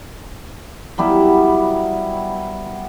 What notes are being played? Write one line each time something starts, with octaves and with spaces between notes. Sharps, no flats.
F#3 G3 B3 E4